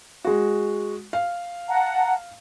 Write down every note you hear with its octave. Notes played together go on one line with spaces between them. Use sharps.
G#3 F#4
F5
F#5 A5 A#5